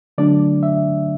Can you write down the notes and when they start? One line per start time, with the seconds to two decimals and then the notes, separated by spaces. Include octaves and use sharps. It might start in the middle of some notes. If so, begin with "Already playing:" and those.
0.18 D3 F#3 A3 D4 D5
0.63 E5